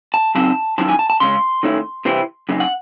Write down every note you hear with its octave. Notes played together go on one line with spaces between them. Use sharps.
A5
C#3 F#3 C4 D#4 A5
D#3 F#3 C#4 E4 A5
G#5
A5
A5
C#3 G#3 C#4 C6
D#3 A3 C#4 E4
C3 E3 C4 E4
F#2 C#3 D#4
F#5